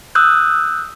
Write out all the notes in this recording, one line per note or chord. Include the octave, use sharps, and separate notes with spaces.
D#6 E6 F#6 G6